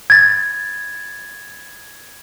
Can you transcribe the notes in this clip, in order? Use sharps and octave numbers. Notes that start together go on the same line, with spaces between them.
G#6 A6